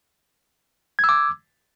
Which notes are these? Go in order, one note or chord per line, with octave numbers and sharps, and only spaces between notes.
D6 E6 G#6